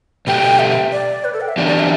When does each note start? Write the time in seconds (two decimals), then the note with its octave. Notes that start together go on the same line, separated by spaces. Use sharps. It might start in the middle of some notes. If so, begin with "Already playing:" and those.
0.27 B2 A3 G4 G5
0.59 E5
0.70 E5
0.92 D5
1.24 B4
1.33 A4
1.41 G5
1.48 E5
1.57 E3 B3 D4 G4 D5
1.68 D5
1.79 E5